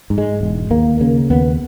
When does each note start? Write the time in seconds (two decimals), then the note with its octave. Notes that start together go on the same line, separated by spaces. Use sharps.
0.10 G#2
0.18 G#3
0.41 E1
0.70 D#2 A#3
1.00 C#3 A#3
1.30 D#2 B3